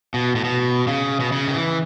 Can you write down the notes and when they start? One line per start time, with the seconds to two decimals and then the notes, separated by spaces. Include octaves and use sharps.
0.14 B2
0.35 A2
0.44 B2
0.87 C#3
1.20 B2
1.32 C#3
1.47 D#3
1.54 E3